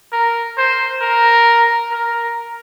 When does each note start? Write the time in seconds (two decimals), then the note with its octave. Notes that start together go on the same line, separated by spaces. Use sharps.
0.12 A#4
0.57 C5
1.02 A#4
1.91 A#4